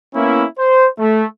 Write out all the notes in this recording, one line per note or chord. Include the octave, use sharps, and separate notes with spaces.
A#3 B3 C#4 E4
C5
A3